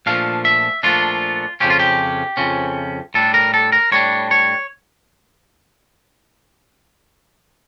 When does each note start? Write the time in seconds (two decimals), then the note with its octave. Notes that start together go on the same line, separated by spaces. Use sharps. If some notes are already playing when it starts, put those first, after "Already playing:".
0.06 A#2 F3 A3 D4 F5
0.45 E5
0.83 A#2 F3 A3 D4 F4
1.60 F2 C#3 F3 C#4 G4
1.70 F4
1.79 G4
2.37 F2 C#3 F3 C#4
3.14 A2 G3 D4 A4
3.34 A#4
3.54 A4
3.72 A#4
3.92 A2 G3 D4 C#5
4.31 C#5